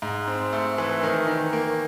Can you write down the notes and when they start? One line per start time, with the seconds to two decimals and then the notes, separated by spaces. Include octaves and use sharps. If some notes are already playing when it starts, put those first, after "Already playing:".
0.02 G#2
0.27 C4
0.53 A3
0.78 E3
1.03 D#3
1.28 D#3
1.53 A#3